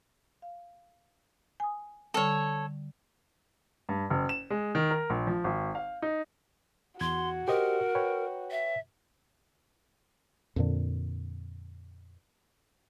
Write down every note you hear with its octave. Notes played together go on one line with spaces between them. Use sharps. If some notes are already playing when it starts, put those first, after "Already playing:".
F5
G#5 D#6
D3 G3 A4 C#5
G2
F#1
E7
G#3
D#3
A#4
A#1
F3
G#1
F5
D#4
E2 F#4 C6 G#6
G4 A#4 C5 D#5
B4 C#5 G5
E5
F2 A#2 D3